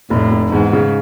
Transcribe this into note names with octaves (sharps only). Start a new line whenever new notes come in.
F1 A2
F1
E2 G#2
C#3